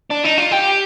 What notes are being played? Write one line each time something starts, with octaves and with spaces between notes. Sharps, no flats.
D4
D#4
F4
G4